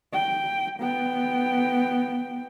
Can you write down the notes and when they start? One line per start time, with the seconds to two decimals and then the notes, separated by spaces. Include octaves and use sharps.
0.13 G5
0.79 B3 G5